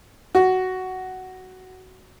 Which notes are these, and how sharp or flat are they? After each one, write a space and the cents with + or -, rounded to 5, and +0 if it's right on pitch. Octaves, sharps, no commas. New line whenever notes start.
F#4 +10